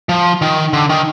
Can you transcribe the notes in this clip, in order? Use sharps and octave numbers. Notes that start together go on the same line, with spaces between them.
F3
D#3
D3
D#3